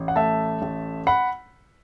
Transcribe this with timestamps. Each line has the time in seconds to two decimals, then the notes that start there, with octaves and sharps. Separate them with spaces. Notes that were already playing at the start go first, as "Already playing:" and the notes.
Already playing: A1
0.08 F#5
0.16 A3 E5 A5
0.62 A1
1.07 F#5 B5